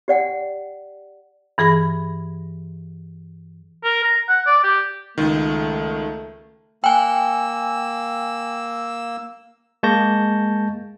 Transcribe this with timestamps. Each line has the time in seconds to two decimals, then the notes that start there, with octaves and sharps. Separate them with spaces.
0.08 G4 D5 F#5 G5
1.58 G2 E3 G#4 B5 A#6
3.84 A#4
4.04 A#5
4.29 F#5
4.47 D5
4.63 G4
5.18 C#2 D#3 A3
6.84 A#3 G5 G#5 E6
9.83 G#3 A#3 A5 C#6 G6 A#6